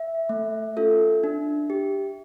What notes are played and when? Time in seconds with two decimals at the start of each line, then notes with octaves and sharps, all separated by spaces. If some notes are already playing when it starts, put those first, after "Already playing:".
Already playing: E5
0.29 A3
0.77 C#4 F4 A4
1.24 D4
1.70 G4